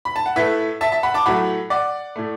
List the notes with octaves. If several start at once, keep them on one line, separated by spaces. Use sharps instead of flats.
B5
A5
F#5
A2 A3 B4 E5
E5 A5
E5 A5
F#5 B5
A5 D6
A2 F#3 A3 F#5 B5
D5 F#5
A2 A3